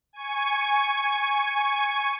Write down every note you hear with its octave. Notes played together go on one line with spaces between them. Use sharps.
G#5 C#6